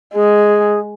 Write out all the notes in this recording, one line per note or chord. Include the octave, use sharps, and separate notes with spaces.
G#3 G#4